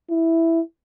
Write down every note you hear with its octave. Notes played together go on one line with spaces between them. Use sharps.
E4